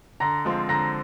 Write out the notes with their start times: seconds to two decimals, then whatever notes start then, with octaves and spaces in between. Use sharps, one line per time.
0.20 D3 A#5 A#6
0.45 F3 G#3 C4 F4
0.69 D3 A#5 A#6